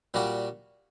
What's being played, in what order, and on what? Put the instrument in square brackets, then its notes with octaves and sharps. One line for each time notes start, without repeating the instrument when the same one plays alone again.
[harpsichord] A#2 G3 D4 F#4